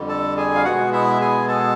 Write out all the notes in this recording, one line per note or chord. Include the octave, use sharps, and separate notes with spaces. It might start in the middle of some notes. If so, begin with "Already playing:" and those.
Already playing: F2 D3 G3
A4 A5
G#4 G#5
F5
B2 G#3 B3 F#4 F#5
E4 E5
G#4 G#5
A4 A5